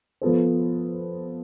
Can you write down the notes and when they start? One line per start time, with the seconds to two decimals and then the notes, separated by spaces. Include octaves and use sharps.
0.21 F3 B3 F4 A4 C5